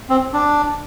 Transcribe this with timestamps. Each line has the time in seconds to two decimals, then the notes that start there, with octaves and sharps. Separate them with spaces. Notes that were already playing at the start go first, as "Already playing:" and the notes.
0.10 C4
0.33 D4